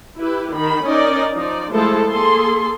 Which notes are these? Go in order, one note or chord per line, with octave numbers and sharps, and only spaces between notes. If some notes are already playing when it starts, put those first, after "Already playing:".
E4 G4 B4
D#3 B5
C#4 D#4 A#4 D5 D#5
F3 D#4 D5
F3 G#3 A3 E4 A4 C5
A#3 G#4 A4 C6